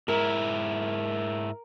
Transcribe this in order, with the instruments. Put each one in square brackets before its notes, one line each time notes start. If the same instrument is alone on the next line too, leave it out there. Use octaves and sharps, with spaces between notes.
[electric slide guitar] G#2 E4 [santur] A#4